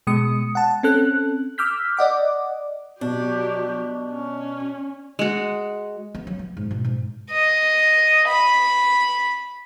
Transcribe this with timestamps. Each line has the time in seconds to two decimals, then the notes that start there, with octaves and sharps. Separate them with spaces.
0.07 B2 G#3 D#6 C#7
0.55 F#5 A5
0.83 C4 C#4 A4 F#6
1.58 D6 E6 F6 G6 B6
1.97 D5 D#5 F#5 D6
3.01 B2 F#3 D4 G4
4.13 C#4
5.19 G#3 F#4
6.15 B3
6.27 F#3
6.39 B3
6.57 G#2
6.71 B2
6.85 G#2
7.31 D#5
8.28 B5